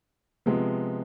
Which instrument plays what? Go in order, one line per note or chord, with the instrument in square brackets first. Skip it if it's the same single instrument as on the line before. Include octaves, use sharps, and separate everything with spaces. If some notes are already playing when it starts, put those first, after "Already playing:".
[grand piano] C3 F3 G#3 B3